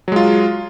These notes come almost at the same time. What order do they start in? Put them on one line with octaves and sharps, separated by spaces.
F#3 G#3 F4